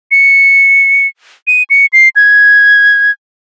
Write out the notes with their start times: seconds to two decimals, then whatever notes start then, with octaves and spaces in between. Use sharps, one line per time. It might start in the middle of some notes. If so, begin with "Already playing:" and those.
0.11 C#7
1.47 D#7
1.70 C#7
1.93 C7
2.16 G#6